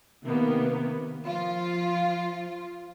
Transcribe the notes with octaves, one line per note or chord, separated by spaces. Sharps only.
C3 D#3 A#3 B3
F3 F4